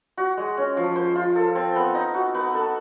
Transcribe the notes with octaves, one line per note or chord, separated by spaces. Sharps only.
F#4
G#3
C#4
F3
C5
F4
A4
C4
B3
D#4
F#4
B3
A4